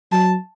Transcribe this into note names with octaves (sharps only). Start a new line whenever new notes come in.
F#3 A5